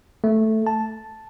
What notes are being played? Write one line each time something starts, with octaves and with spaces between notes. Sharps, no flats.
A3
A5